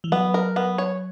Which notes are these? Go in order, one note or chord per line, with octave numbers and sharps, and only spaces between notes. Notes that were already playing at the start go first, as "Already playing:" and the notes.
E3
F#3 B3
A#4
B3
C#5